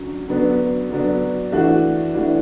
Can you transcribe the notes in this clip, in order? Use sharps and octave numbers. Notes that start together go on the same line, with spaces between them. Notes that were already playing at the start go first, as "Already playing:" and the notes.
Already playing: D3 F#3 C#4
D3 F#3 B3 D4
D3 F#3 B3 D4
E3 A3 D4 F#4
E3 A3 D4 F#4